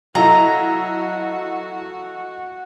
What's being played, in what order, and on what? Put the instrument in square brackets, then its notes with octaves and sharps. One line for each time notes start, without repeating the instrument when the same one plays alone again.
[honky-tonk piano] F#3 E4 [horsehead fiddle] F#4 [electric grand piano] A4 D#5 F5 [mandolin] A#5